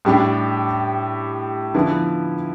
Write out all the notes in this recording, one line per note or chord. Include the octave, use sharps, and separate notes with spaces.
A2 G3 D4 G4
D3 F3 B3 E4